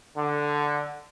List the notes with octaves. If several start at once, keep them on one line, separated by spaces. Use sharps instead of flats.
D3